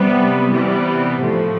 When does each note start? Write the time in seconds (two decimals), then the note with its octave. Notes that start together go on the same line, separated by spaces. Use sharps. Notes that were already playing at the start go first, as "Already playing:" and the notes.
Already playing: C3 G3 B3
0.51 C3 E3 G3 B3
1.22 A2 F3 A3